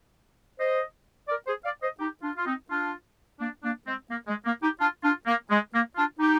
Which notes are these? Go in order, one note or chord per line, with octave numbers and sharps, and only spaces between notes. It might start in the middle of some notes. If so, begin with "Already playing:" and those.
C5 D#5
A#4 D5
G#4 C5
D5 F5
C5 D#5
D#4 G4
D4 F4
F4
C4 D#4
D4 F4
A#3 D4
A#3 D4
G#3 C4
A#3
G#3
A#3
D#4 G4
D4 F4
D4 F4
A#3
G#3
A#3
D4 F4
D#4 G4